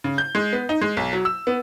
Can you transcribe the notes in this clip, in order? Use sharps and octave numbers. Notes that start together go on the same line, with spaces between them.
C#3
G6
G#3
B3
D#4
G#3
B1
F#3
E6
B3